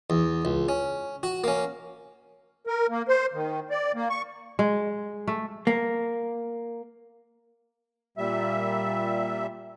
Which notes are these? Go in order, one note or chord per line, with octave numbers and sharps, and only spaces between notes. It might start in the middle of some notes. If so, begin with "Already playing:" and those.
E2
C#2
C#4
F#4
A#3 C#4
A#4
A#3
C5
D#3
D5
A#3
C#6
G#3
A3
A#3
A#2 G3 E5